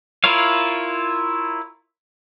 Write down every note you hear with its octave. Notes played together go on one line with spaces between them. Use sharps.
E4 F4 A#4 C#5 F5